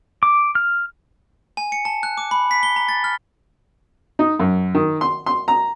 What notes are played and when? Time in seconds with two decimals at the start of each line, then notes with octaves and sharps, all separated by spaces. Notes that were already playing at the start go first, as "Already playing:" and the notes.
0.23 D6
0.55 F6
1.57 G#5
1.72 C#7
1.85 A5
2.03 F#6
2.18 D6
2.31 B5
2.51 B6
2.63 G7
2.76 A#5
2.89 A6
3.04 F6
4.19 D#4
4.39 F#2
4.75 D#3
5.01 C6
5.26 C6
5.48 A#5